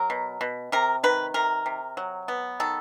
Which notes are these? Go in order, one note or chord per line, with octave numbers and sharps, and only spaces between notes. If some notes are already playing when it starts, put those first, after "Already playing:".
Already playing: F#3 A#4
B2
B2
C3 A#4
D#3 B4
C3 A#4
C3
F#3
B3
D#3 A4